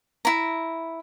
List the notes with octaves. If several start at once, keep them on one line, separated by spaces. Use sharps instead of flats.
E4 A#5